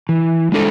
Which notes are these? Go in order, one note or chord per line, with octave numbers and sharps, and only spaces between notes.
E3
G#3 D4 A4